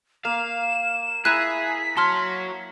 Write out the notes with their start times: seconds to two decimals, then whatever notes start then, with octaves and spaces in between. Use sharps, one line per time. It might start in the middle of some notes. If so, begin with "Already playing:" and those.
0.25 A#3 F5 E7
1.25 E4 G#4 A#5 F#6 B6 D#7 E7
1.97 F#4 C#5 A5 C6 F6